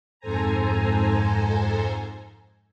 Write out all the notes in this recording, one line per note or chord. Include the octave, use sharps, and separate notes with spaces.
F2 G#2 A4 C5 G#5 A#5